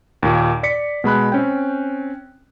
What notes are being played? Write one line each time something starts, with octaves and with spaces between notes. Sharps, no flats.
D#2 A#2
D5 B6 C#7
B2 G#3 B5 F#6
C4 C#4 G5